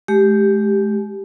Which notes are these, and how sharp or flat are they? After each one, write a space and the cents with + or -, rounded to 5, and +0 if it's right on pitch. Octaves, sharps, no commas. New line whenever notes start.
G#3 +40 G4 +0